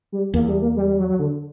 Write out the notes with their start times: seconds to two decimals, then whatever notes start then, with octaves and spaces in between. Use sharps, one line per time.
0.12 G3
0.34 E2 A#3
0.48 G3
0.62 A#3
0.76 G3
0.88 G3
0.99 F#3
1.09 F#3
1.19 D3